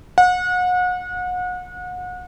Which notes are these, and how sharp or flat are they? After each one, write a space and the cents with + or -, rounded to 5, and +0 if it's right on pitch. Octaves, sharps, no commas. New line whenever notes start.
F#5 -35